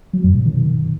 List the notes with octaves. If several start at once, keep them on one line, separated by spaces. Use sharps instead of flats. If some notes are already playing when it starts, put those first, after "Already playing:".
F#3
F#2
B2
D#3